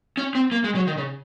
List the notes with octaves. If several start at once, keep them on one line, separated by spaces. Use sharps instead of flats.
C#4
C4
A#3
G#3
F#3
D#3
C#3